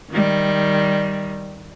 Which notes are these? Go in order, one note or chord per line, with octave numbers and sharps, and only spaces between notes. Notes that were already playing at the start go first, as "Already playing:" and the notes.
D#3 G3